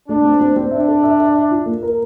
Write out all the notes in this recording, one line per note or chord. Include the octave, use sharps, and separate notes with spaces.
A3 D4
C4
C4
C4
D4 E5
A4
E5
E5
E5
F4
A#3
A#4